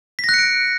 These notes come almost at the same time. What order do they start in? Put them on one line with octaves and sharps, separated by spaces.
B6 A#6 F#6 C#7 D7